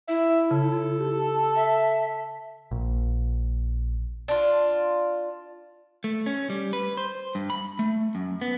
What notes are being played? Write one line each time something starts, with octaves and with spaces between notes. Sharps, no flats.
E4 E5
C#3 A4
G4
E5
A#1
D4 F4
A3
C#4
G3
B4
C5
G2
B5
A3
F#2
B3